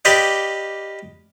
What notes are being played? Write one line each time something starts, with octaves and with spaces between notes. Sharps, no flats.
G4 B4 D5 D#5 F5 G5